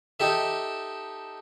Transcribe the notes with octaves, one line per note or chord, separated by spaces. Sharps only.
D#4 G4 A4 E5